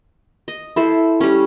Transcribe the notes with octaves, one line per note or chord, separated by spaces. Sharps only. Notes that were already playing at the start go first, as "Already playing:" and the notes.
D#5
E4 A4 C5
G3 C#4